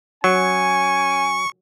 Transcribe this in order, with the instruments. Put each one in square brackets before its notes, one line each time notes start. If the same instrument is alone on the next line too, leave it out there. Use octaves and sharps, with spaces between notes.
[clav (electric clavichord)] F#3 [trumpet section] C#4 G#5 [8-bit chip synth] C#6